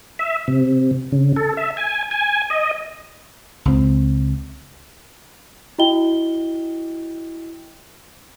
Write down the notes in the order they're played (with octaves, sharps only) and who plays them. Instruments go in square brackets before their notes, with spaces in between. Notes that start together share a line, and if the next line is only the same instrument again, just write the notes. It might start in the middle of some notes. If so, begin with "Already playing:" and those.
[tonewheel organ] E5
C3
C#3
A4
E5
G#5
G#5
D#5
[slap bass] C#2 C4
[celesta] E4 F#4 D#5 G5 G7